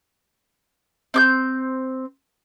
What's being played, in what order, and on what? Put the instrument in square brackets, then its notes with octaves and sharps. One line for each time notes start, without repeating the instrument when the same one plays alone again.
[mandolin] C4 D6 G6